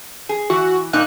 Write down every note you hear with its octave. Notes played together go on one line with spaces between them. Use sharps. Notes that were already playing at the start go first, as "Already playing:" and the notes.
G#4
E3 F#4
A#2 A#3 D#4 F#6